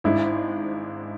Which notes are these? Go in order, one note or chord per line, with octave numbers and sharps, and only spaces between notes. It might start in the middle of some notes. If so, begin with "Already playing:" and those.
G#1 G#2 G#3 D4 E4